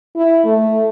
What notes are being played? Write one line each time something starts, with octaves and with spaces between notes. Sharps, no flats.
E4
A3